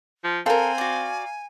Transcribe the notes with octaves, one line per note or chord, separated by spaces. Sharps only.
F3
C4 A4 A#4 F5 G#5 A#5
F#4 D5